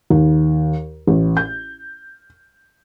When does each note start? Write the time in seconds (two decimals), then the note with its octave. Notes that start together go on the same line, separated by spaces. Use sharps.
0.10 D#2
1.07 A1
1.37 G6